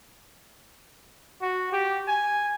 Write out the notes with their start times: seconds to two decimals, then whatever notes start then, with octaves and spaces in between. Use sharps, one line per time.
1.42 F#4
1.73 G4
2.08 G#5